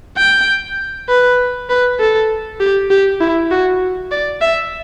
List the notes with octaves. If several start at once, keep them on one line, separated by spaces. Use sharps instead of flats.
G5
B4
B4
A4
G4
G4
E4
F#4
D5
E5